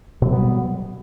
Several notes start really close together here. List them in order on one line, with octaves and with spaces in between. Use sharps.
B2 F#3 G3 B3